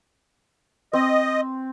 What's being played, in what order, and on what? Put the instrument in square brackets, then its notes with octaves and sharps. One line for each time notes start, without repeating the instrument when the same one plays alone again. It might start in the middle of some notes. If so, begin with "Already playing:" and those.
[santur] C4 [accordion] D#5